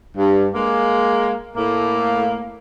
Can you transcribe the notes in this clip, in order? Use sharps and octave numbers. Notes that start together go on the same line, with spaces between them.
G2
G#3 A#3
A2 A#3